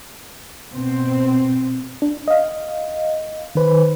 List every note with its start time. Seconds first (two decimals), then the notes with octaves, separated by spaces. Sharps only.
0.70 B2 C4
2.02 D4
2.28 D#5 F5
3.55 D#3 B4 C5